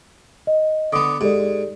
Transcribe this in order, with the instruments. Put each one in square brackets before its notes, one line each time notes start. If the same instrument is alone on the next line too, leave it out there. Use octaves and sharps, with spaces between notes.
[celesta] D#5
[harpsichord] D3 B3 [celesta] D6 D#6
[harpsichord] G#2 [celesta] G4 A4 D5